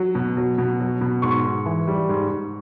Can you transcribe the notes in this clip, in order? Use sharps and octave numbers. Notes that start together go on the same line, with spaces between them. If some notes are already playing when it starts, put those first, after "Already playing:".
Already playing: F#3
B2
F#3
B2
F#3
B2
G#2 C#6
G#2
E3
G3
G#2
G#2